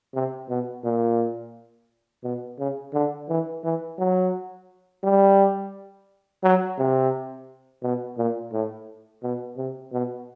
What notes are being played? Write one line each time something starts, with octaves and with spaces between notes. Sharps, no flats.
C3
B2
A#2
B2
C#3
D3
E3
E3
F#3
G3
F#3
C3
B2
A#2
A2
B2
C3
B2